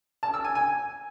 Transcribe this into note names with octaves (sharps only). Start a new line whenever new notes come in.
A5
E6
G#5
G#5